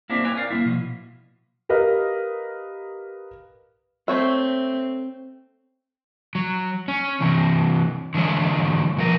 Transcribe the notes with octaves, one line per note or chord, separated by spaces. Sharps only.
A#3 C4 D4 E4 G4
C4 B4 C#5 G5 G#5
A#4 D5 F5
A#3 C4 E4
B2 F3
G4 A#4 B4 D#5 F5
A3 C4 C#5 E5
F#3
C#4
C3 E3
D3 E3 G#3 C#5
B2 F3 A#4